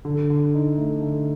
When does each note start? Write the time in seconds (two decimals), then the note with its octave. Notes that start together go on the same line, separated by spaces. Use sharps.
0.05 D3
0.30 D3
0.54 D#4
0.78 A3
1.02 D3